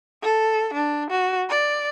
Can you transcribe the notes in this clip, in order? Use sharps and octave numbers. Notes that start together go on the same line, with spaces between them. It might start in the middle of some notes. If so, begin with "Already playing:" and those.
A4
D4
F#4
D5